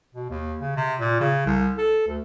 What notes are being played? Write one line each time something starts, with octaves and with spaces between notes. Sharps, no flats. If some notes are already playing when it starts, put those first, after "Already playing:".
B2
D#2
C#3
C3
A#2
C#3
C2
A4
D2